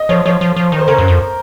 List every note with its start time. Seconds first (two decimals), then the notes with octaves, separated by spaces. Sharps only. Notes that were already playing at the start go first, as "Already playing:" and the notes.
Already playing: D#5
0.09 F3 C#5
0.26 F3 C#5
0.41 F3
0.56 F3
0.72 D#3
0.78 C5
0.87 C#3 A#4
0.98 F#2
1.08 F2